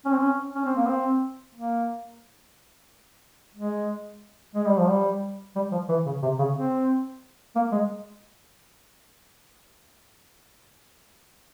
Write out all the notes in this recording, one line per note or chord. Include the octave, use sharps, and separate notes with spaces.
C#4
C4
C#4
C#4
C4
A#3
C4
A#3
G#3
G#3
G3
F3
G3
G3
F3
E3
C#3
C3
C#3
C4
A#3
G#3